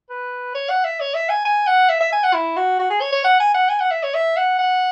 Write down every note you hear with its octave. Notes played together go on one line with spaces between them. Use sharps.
B4
C#5
F#5
E5
C#5
E5
G#5
G#5
F#5
E5
E5
G#5
F#5
E4
F#4
F#4
G#4
C#5
C#5
F#5
G#5
F#5
G#5
F#5
E5
C#5
E5
F#5
F#5